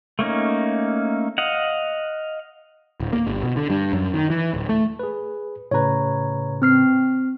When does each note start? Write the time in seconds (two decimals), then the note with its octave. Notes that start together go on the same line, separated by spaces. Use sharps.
0.19 A3 A#3 C#4 D#4
1.38 D#5 F5 F#5
3.00 D1
3.13 A#3
3.27 G1
3.43 B2
3.56 D3
3.70 G2
3.93 F#2
4.14 D#3
4.30 E3
4.54 D1
4.69 A3
4.99 G#4 B4
5.71 A2 C#3 B4 C#5 A#5
6.62 C4 F6 C7